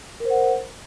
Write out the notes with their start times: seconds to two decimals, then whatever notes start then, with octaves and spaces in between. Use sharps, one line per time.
0.20 A#4
0.25 C5
0.30 F#5